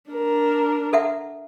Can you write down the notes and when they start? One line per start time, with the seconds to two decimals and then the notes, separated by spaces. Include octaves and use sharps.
0.10 D4 A#4
0.93 A4 E5 F#5